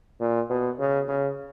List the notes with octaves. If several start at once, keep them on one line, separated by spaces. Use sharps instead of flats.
A#2
B2
C#3
C#3